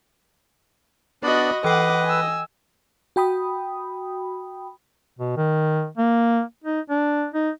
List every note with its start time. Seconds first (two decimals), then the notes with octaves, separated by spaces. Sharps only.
1.23 B3 D4 F#4 D5 D#5 B5
1.64 E3 B4 D#5 F#5 G5 D6
2.05 G#5 E6
3.16 F#4 G5 B5 D#6
5.19 B2
5.37 D#3
5.97 A#3
6.64 D#4
6.90 D4
7.34 D#4